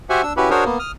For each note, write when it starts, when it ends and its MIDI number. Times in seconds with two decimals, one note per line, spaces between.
0.10 0.22 66
0.10 0.22 67
0.10 0.22 72
0.10 0.22 76
0.10 0.22 78
0.10 0.22 80
0.23 0.33 62
0.23 0.33 88
0.37 0.50 61
0.37 0.50 64
0.37 0.50 66
0.37 0.50 67
0.37 0.50 71
0.50 0.64 62
0.50 0.64 66
0.50 0.64 68
0.50 0.64 70
0.50 0.64 72
0.50 0.64 73
0.65 0.78 58
0.65 0.78 59
0.79 0.92 87
0.79 0.92 89